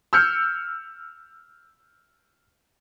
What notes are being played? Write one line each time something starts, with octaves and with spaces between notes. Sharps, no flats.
E6 F6 G6 C#7